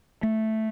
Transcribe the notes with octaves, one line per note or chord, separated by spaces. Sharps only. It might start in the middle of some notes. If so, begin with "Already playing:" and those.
A3